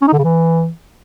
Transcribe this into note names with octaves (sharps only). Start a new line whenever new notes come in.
C#4
D#4
D3
C#3
E3